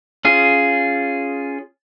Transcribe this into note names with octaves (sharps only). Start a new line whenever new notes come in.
C#4 F4 G#4